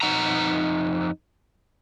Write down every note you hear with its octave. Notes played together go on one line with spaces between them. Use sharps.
F2 D#4 F#5 A#5